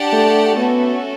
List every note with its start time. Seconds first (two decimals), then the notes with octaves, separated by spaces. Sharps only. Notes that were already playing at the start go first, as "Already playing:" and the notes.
Already playing: D4 G4 D5 F#5 A5
0.13 A3
0.57 A3 B3 C#4 F#4 A4